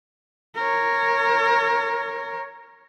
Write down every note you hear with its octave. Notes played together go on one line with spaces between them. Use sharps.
A#4 C#5